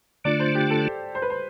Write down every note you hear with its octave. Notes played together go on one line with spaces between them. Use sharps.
D3 A3 D4 F4 D5
C5
G4
A4
C5
B4
C5